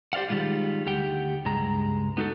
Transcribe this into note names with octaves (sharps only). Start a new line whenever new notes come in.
G4 C5 D5 F5 F#5
D#3 F3 G3 G#3 F4
D2 G4 F#5 G5
C#2 G2 G#3 A#5
B3 D#4 F#4 G4 A4